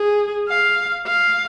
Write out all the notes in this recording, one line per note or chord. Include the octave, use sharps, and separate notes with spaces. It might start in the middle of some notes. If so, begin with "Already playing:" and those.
Already playing: G#4
F5
F5